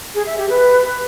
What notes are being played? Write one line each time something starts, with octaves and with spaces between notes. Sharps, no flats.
G#4
E5
G4
B4